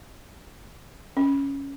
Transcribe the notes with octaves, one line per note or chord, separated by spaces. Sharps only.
C#4